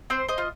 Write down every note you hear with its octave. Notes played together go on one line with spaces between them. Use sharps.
C4 C5
C5 D#5
F4